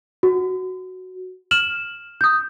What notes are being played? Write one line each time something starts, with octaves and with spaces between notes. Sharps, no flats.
F#4
F6 E7 F#7
D#6 G6